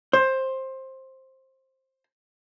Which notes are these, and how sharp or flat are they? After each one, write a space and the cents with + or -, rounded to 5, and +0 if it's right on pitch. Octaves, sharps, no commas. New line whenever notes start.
C5 +15